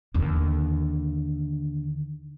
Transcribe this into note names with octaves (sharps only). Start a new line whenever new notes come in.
D#2 D3